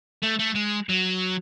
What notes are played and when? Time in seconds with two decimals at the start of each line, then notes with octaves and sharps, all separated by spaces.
0.22 A3
0.39 A3
0.55 G#3
0.89 F#3